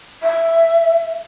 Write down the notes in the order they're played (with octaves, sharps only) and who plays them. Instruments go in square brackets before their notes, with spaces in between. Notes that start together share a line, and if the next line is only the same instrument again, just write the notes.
[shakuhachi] E5